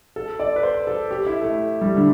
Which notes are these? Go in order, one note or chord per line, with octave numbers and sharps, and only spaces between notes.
A4
D5
B4
C5
A4
G4
E4
A3
G3
D3